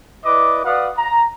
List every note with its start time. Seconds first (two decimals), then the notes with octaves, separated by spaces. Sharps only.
0.24 E4 B4 D5 D#5 D6
0.65 F#4 B4 D5 F5 F#5 D#6
0.98 A#5